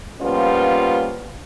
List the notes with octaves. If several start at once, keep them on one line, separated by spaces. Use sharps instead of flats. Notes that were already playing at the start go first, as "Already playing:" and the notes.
F3 G3 A#3 B3 C#4 F4